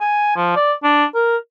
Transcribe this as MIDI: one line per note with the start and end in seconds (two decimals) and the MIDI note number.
0.01 0.33 80
0.36 0.55 53
0.56 0.73 74
0.83 1.05 62
1.14 1.36 70